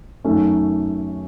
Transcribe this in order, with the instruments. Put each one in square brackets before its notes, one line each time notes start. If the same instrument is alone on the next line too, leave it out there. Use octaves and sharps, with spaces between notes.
[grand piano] F#2 D#3 A3 C#4